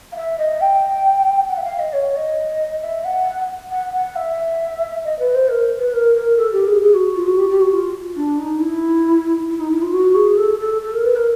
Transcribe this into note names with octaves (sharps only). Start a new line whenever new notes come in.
F5
E5
D#5
G5
F#5
E5
F5
D#5
C#5
D#5
E5
F#5
F#5
F#5
E5
D#5
B4
C5
A#4
B4
A#4
A#4
A4
G4
G#4
G#4
F#4
F4
F#4
G4
G4
F#4
F4
D4
D#4
E4
E4
D#4
E4
F4
F#4
G#4
A4
A4
A4
A#4
B4
A#4